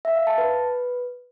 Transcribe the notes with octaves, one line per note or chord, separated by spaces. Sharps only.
E5
F5
A5
B4